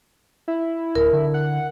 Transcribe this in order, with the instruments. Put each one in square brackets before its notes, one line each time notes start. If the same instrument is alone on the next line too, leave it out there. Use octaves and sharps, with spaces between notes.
[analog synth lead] E4
[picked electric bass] D1 [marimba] A#4
[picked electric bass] D3
[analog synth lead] F#5